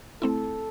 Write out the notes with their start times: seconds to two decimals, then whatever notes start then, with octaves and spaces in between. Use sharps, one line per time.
0.22 A3 C4 E4 A4